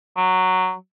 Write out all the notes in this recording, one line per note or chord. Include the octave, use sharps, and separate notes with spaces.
F#3